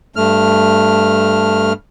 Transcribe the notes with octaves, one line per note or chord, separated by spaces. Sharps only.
G2 A3 F6